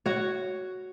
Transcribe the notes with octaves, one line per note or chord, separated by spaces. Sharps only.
F#4 C#5